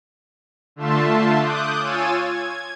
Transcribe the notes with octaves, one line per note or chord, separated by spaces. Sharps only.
D3 A3 F4 E5 A5 C6
D6 D#6 F#6 G6
F4 C#5 G#5 E6 A6 D#7
G#6